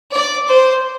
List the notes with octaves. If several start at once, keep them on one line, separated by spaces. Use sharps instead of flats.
D5
C5